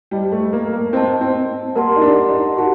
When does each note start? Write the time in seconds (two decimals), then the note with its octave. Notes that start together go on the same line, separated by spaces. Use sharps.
0.11 G3 C5 D#5 A5
0.32 A3
0.53 A#3
0.73 A#3
0.93 C4 C5 D#5 A5
1.21 C4
1.75 A#3 G4 A#4 F#5 A5 C6
1.96 D#4
2.02 D4
2.29 D#4
2.56 F#4 G4 A#4 F#5 A5